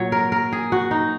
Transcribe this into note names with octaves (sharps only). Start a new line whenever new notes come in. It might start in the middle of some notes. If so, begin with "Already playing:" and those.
Already playing: A#2 F#3 C#5
A#4
A#4
G#4
F#4
D#4